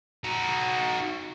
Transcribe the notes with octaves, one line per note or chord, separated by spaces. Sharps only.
D#4 F#4